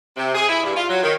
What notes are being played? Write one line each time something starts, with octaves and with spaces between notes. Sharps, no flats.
C3
G#4
E4
G2
F4
F#3
D#3